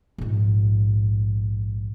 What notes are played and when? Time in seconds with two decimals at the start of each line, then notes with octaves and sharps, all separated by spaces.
0.18 A#1 G#2